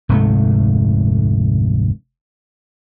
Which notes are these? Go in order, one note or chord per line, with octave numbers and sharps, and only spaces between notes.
F1 D2 G#2 A3